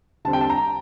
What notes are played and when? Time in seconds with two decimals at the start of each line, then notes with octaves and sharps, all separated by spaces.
0.25 D3 G3 C4 A5
0.33 G5
0.41 A5
0.50 A#5